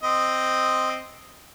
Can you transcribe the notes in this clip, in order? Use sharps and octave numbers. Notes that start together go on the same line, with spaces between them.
C4 D#5